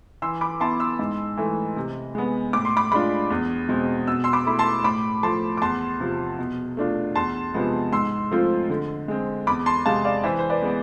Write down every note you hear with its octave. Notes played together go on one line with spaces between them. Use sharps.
E3 C6 E6
B5 D6
B3 E4 A5 C6
C6 E6
G#2
E3 A3
C3
G#3 B3
A2 D6
C6
B5 D6
G#3 D4 F4 B5 D6
E2
B2 G#3 C4
B2 E6
C6 E6
B5 D6
A3 E4 B5
A5 C6
A2 B5 D6
F3 A3 A5 C6
D6
E2 A5 C6
C3 F3
B2
A3 D4 F4
E2 A5 C6
C3 F3 G#3 B3
G#2 C6 E6
F3 A3 C4 F4
D3
G#3 C4
E2 B5 D6
A5 C6
C3 G#3 F5 A5
D5 F5
E3 C5 E5
C5
B4 D5
G#3 B3